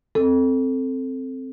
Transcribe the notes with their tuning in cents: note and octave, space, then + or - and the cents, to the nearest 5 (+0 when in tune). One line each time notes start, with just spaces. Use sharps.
C4 +0 A4 +0